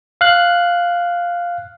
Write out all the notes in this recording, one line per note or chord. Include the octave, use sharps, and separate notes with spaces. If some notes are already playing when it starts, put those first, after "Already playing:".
F5 F#6